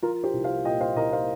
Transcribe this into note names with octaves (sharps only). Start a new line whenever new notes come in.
F3 F4 A#4
G4 C5
C2
C5 F5
A#2 D#5 G5
C5 F5
C2 A#4 D#5
C5 F5